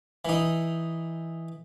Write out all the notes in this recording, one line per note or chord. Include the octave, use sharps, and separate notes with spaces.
E3 D#4